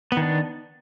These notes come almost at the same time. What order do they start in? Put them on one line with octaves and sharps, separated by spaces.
B3 D#3 D4